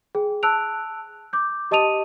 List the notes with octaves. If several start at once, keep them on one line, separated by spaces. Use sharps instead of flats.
G#4 G5
A5 E6 F#6 D7 F7
D6 G6
G4 D#5 A5 D#6 D#7 F7